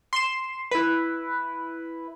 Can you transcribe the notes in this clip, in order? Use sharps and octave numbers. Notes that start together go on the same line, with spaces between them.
C6 E7
E4 B4